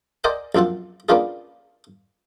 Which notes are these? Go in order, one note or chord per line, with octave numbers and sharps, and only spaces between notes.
A#4 C5 D5 D#5 F#5 G#5
A#1 F#2 C4 F4 F#5
A#3 B3 C#4 D4 F4 G#4